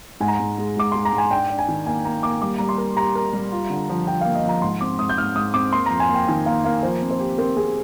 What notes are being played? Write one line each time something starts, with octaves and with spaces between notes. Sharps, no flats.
G#2 G#5
A#5
G#2 G#5
G#3
G#2 D6
G#3 C6
A#5
G#2
G#5
D4 G5
D4
G#5
D#3
A#3 G#5
A#3 A#5
A#3 D6
G3 D6
G3 A#5
C6
A#4
G4 A#5
A#4
G3
F4
D3
F3
F3 G5
A#3 F5
D#5
F3 A#5
G#2 C6
C4 D6
G#2 D#6
G6
G#2 F6
G#2 D#6
C4 D6
A#3 C6
F2 A#5
G#5
A#3
G5
D#3 G#5
A#3 F5
A#3 F5
F3 C5
C4
C5
G4
C4 A#4
C4 G#4